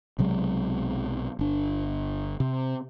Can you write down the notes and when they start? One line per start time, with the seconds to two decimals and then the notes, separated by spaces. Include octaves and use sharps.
0.19 B1 C3 F#3 G#3
1.39 G1 D4
2.40 C3